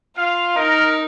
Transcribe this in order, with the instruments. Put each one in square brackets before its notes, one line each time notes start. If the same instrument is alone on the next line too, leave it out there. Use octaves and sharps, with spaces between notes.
[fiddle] F4 [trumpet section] F5
[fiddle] D#4 [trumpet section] A#4